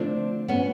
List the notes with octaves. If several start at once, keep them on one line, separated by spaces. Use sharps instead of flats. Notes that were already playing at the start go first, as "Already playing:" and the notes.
Already playing: D3 F3 A3 C4 D4
B3 C#4